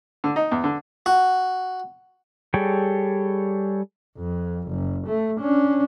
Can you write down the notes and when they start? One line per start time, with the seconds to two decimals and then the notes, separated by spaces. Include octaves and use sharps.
0.24 D3
0.36 D#4
0.51 E2
0.64 D3
1.06 F#4
2.54 G3 G#4 A4 C#5 G5
4.18 F2
4.68 F#1
5.07 A3
5.40 C#4 D4